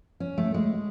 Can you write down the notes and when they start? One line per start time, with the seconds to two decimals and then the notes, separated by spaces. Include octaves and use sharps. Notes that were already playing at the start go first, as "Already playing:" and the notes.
0.20 C#4
0.38 A3
0.54 G#3